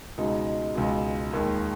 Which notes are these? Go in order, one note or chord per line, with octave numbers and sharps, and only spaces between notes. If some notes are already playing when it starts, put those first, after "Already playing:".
C#2 B2 G#3 D#4
C#2 B2 G#3
D#2 D#3 G#3